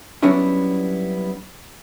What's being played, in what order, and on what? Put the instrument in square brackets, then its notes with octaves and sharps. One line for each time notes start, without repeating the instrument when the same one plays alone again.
[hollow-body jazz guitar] F#3 G3 B3 C#4 D4 E4